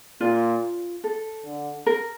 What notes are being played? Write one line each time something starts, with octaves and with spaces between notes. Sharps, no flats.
A#2 F4
A4
D3
A#4